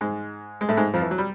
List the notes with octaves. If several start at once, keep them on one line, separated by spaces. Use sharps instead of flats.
G#2 G#3
G#3
A2 A3
G#2 G#3
F2 F3
E3
F#3
G3